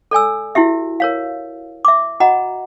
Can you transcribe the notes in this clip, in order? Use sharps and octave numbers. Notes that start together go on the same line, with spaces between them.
A4 D5 G#5 E6
E4 F#4 G4 E5
A#4 C#5 F5
E5 D6
F#4 D#5 F#5 A#5